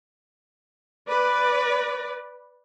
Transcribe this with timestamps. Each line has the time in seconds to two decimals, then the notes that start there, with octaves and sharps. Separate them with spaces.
1.08 B4 D5